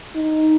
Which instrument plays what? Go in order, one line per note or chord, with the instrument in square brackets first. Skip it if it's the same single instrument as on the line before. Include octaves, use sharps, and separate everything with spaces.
[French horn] D#4